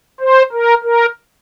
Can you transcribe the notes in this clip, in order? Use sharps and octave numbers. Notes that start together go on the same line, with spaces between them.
C5
A#4
A#4